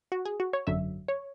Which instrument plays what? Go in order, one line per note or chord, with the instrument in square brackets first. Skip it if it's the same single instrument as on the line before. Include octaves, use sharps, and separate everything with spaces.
[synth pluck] F#4
G#4
F#4
C#5
G#1 F#2 D3 F#3 E5
C#5